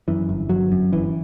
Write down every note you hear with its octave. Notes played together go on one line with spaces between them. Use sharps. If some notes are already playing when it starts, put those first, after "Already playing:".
F#2 E3
G1
G1 F#3
F#2
G1 E3